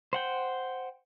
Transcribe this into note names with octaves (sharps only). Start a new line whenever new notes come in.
C5 F#5 G5